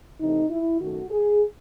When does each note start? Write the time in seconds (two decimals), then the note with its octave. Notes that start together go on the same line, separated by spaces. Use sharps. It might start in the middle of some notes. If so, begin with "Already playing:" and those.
0.20 C3 E3 A3 D#4
0.50 E4
0.80 F#2 D#3 A3 F#4
1.10 G#4